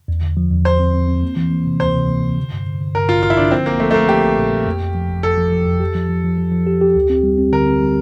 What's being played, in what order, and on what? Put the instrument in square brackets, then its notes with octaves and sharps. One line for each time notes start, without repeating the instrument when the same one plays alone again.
[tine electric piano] E2
D3
F3
E2
[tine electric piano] E2 [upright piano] C5
[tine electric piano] C4
C4
C4
A#3
E3
A#3
C3
[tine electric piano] D2 [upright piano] C5
[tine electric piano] C3
A#3
C3
D3
G2
D3
D3
[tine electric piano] G2 [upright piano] A#4
[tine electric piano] A1 [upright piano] F4
[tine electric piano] A1 [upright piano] F4
[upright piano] E4
[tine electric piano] D3 [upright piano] D4
[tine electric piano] F3 [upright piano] C4
[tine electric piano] A#1 [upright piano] A#3
[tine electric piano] F3 [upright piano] A3
[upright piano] A3
[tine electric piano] F3 [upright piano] A#3
[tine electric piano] F3 [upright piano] G4
[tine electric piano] A#1
A#2
A3
F2
F2
F3
G1
[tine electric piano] F2 [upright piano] A4
[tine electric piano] F3
F3
F2
G4
F3
F3
F3
F3
F3
G4
G4
D2
C4
G3
C4
[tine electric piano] D3 [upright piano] A#4
[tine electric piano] C4
G3